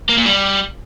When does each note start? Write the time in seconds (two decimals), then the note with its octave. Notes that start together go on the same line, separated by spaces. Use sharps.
0.10 A#3
0.18 A#2
0.26 G3